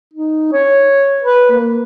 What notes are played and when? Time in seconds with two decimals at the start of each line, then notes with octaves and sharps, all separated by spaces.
0.14 D#4
0.53 C#5
1.22 B4
1.52 A#3